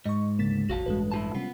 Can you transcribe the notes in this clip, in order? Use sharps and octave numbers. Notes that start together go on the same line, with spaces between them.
G#2 D#5 C#6
D2 C#3 A#3 A6 B6 E7
F1 A#1 F#4 F5 A5
A1 G2 G#3 A4 B4
E4 F4 A5
C3 G3 B3 C#4 F4